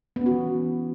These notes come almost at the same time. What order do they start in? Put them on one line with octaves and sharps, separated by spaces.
B3 C#4 F#4 E3